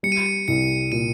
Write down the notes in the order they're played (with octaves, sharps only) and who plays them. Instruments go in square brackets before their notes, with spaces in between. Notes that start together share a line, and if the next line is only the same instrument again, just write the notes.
[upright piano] G3 [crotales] C#7
[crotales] D#7
C#7
[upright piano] C2 [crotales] C#7
[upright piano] A#2 [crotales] D#7